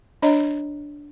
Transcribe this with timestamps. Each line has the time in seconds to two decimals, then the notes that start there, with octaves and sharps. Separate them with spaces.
0.22 D4 C#5 D#5 A#5